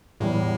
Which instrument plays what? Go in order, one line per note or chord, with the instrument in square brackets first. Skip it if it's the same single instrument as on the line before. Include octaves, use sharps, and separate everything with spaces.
[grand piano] E2 E3 G3 [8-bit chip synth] A2